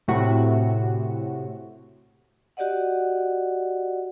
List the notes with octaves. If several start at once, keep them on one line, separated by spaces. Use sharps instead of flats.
A2 C3 F#4
F#4 G4 D5 D#5 F#5